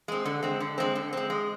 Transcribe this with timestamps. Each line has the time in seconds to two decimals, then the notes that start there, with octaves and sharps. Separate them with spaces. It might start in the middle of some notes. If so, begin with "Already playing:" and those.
0.08 G#3 C4
0.25 D3
0.43 G#3 C4
0.60 D3
0.78 G#3 C4
0.95 D3
1.13 G#3 C4
1.30 G#3